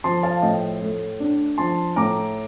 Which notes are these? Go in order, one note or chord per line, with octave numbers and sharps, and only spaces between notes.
F3 A5 C6
F5 A5
A2 D#5 G5
A3
D4
F3 A5 C6
A2 A#5 D6